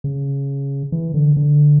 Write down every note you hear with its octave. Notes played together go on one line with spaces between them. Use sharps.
C#3
E3
D3
D3